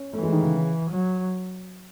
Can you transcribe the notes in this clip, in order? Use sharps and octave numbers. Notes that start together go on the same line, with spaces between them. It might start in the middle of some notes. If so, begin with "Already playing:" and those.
Already playing: C#4
E3 A3
G#3
D#3
C#3
F#3